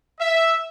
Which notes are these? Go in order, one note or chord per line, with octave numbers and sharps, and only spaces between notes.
E5